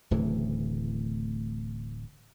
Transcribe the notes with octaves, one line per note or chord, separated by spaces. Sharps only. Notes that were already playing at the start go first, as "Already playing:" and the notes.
D1 A2 C#3 E3